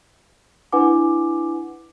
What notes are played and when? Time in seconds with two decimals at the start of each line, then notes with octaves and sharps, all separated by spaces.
0.73 D4 E4 B4 F#5 G#5 D6